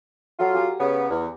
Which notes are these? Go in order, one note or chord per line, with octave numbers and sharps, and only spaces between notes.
F#3 F4 F#4 A4
G4 G#5 A#5
C#3 B3
E2